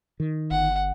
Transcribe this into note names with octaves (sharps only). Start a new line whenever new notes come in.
D#3
G1 F#5